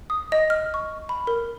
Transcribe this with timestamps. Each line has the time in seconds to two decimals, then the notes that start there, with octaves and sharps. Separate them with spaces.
0.10 D#6
0.32 D#5
0.50 F6
0.74 C#6
1.09 B5
1.27 A#4